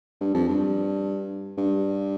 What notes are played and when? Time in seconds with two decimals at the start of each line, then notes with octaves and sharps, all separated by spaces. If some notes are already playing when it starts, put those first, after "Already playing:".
0.20 G2
0.34 F2
0.48 G2
1.57 G2